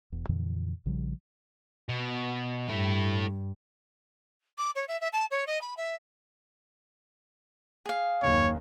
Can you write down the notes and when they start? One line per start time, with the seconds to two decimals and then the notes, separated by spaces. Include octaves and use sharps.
0.12 E1 E2
0.29 F2 A#2 D3 E3
0.86 A#1 C#3 F3 G3
1.89 B2
2.70 G2 A3 E4
4.58 D6
4.75 C#5
4.88 E5
5.01 E5
5.13 A5
5.31 C#5
5.47 D#5
5.61 B5
5.77 E5
7.86 G#4 F5
8.22 F#1 D#2 C#5